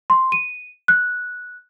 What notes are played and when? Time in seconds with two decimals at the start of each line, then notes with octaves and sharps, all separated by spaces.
0.10 C6
0.32 D#7
0.88 F#6